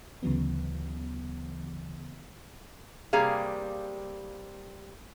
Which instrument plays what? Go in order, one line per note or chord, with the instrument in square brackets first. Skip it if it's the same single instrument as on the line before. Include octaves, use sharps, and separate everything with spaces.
[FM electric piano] D2 C#3 E3 F#3 B3
[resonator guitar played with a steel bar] C3 G3 A#3 G#4 F5